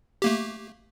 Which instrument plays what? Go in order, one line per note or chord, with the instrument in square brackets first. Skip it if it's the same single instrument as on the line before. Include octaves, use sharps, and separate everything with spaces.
[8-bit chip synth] A3 A#3 G4